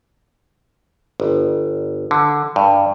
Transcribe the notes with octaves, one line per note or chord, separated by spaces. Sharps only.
G1
D3
G2